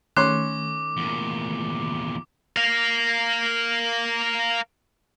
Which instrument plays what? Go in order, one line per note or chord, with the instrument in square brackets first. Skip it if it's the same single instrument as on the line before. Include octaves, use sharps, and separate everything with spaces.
[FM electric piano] D#3 A3 [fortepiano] C#4 C6 F#6 [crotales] D6
[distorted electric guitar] E2 A#2
A#4 F5